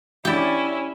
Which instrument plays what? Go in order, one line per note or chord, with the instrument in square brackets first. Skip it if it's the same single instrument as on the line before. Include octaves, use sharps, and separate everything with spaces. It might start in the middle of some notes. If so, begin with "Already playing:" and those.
[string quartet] C#4 E4 [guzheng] G4 D5